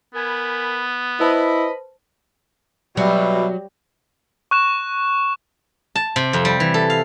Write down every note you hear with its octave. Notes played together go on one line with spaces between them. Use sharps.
B3 A#4 G#5 B5
E4 B4 C5 D#5 A5 B5
B2 F#3 G3 E5
C#6 F#6 E7
A5
C3
F2
G3
E3
A4
F5